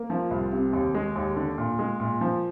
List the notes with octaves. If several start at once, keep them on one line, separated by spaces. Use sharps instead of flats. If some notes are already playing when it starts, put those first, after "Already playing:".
Already playing: A#3
F3
C2
C3
D#2
G#3
D#2
D3
A#2
G#3
A#2
F3